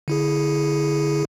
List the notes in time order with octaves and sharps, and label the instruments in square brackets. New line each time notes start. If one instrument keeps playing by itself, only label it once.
[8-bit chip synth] D3 E4 G#4